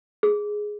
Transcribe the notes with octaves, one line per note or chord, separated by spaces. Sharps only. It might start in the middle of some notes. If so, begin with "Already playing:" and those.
G#4